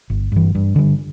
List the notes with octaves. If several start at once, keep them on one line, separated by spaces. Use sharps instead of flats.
G1
G2 E3
G2
D3 G3